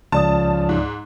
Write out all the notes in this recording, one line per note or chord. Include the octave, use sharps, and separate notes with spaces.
C#2 C#3 F3 D5 A5 D#6
G#2